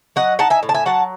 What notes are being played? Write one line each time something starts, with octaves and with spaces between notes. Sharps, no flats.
F#3 D#5 F#5
D#4 F#5 A5
E5 G#5
A2
A5
E5 G#5
F#3 F#5 A5